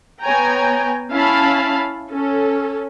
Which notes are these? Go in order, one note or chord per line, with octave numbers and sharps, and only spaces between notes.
B3 C#5 G5 G#5 A#5
C#4 E4 F5 A5 B5
C#4 A4